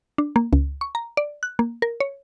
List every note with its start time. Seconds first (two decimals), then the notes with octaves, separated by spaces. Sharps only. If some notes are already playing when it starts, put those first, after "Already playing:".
0.18 D4
0.36 A#3
0.53 C#2
0.81 C#6
0.95 A#5
1.17 D5
1.43 F#6
1.59 A#3
1.82 A#4
2.00 C#5